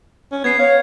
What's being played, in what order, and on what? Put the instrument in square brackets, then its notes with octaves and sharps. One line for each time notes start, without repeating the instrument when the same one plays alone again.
[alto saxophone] C#4
[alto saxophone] B3 [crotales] G#6 C7
[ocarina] C#5 [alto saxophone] F5